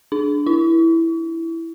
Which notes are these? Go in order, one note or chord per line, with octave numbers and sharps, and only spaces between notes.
D4
E4